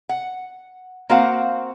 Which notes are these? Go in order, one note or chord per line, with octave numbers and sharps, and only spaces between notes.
F#5
A#3 C4 F#4 C5 F5 F#5